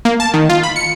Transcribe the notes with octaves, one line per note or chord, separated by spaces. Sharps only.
A#3
A5
D#3
F4
B5
C#7